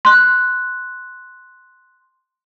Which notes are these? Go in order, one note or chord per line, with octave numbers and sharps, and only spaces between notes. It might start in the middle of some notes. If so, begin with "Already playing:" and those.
C6 F#6